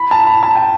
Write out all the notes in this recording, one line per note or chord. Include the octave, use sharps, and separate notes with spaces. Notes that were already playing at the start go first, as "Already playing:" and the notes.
Already playing: B5
A5
B5
A5
G5